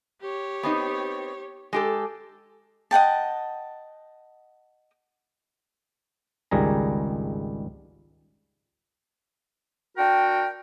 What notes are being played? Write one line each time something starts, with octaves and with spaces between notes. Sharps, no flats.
G4 C#5
B3 C4 D#4
G#3 G4 A4
D#5 F#5 G5 A5
G#1 C#2 D#3 G3 G#4 A#5
D4 F#4 A#4 G5